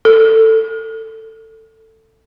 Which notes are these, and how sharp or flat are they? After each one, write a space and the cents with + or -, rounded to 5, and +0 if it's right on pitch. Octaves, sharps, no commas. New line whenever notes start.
A4 +15